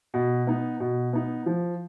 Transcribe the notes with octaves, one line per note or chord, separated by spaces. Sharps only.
B2
B3 D#4
B2
B3 D#4
F3